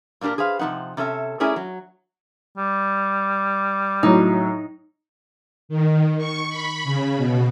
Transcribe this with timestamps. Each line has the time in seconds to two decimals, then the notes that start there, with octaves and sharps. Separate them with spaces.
0.21 A#2 A#3 D4 G4 A#4
0.38 G#4 B4 C5 F5
0.59 C3 F3 B3 D#4 F#5
0.97 C3 C#4 A4 E5
1.40 A3 C#4 E4 G#4 A#4 D5
1.56 F#3
2.58 G3
4.03 A2 F#3 D#4
5.69 D#3
6.18 C#6
6.49 B5
6.84 C#3
7.17 B2